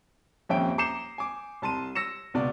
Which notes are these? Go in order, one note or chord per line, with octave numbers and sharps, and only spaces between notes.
D#1 F2 C#4 E5 G5 D7
A#5 D6 G6 C7 C#7 E7
G#5 D6
C2 A5 C6 D#7
E6 A#6 C#7 E7
C#2 B2 D5